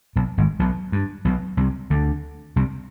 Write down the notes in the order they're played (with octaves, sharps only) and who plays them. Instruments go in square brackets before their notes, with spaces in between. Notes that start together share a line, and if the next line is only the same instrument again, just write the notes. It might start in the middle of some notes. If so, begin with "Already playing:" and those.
[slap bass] B1 B2
G#1 G#2
B1 B2
G2
B1 B2
C2 C3
D2 D3
C2 C3